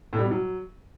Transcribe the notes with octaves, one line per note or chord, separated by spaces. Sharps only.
A2
G3
B2
F#3